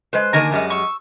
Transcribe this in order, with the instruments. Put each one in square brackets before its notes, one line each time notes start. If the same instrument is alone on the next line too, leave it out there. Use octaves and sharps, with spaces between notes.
[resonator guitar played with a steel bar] G#3 B4 C5
[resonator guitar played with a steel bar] D3 D#3 A#3 [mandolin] A#4 G#5 A#5
[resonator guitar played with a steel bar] F#2 G3 G#3
[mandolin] C#6 E6